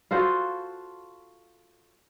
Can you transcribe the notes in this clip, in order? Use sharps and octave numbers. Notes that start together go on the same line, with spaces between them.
F4 F#4 A4 C5